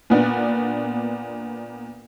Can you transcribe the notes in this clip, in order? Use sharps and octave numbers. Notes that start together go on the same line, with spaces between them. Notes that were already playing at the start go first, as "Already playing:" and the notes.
A#2 B3 D4